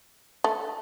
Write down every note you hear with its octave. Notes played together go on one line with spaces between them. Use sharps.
A3